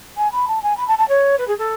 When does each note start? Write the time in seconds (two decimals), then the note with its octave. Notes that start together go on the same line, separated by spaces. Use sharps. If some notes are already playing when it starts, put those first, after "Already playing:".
0.17 G#5
0.32 B5
0.48 A5
0.63 G#5
0.77 B5
0.88 A5
0.98 A5
1.08 C#5
1.38 B4
1.48 G#4
1.58 A4